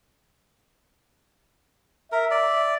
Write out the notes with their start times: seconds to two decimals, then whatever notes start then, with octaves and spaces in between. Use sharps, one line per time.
2.12 A#4 E5
2.31 D5